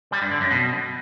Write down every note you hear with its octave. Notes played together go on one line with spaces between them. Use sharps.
G3
G2
D3
F#2
B2